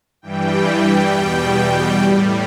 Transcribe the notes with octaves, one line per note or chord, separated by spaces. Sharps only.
G2 E3 G3 G5
E2 B2 G3 G5
A2 G3